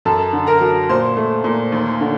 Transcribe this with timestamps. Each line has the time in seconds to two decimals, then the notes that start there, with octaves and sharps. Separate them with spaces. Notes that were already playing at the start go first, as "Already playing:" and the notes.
0.05 F#2 A4 A5
0.33 D3
0.47 A#4 A#5
0.61 F#3
0.89 A#2 C5 C6
1.17 A3
1.44 A#2
1.72 D#2
2.01 D3